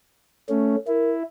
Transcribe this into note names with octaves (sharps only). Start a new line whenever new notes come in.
A3 C#4
E4 A#4